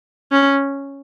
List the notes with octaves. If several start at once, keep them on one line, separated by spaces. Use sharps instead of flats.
C#4